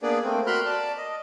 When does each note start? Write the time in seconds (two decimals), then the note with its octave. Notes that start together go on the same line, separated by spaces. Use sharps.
0.02 A#3 B3 D4 G#4 B4 D5
0.23 A3 A#3 C4
0.47 F#4 A#4 B5 C6 F6 F#6
0.65 D5 A5
0.97 D#5